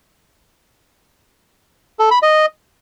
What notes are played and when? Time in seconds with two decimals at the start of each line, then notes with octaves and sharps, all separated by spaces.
1.99 A4
2.11 B5
2.22 D#5